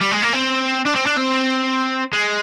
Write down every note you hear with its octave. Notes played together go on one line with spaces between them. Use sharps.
G3
G#3
A#3
C4
D4
C4
D4
C4
G#3